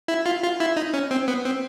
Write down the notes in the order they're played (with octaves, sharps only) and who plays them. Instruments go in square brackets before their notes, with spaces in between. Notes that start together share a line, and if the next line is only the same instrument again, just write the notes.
[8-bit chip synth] E4
F4
F4
E4
D#4
C#4
C4
B3
C4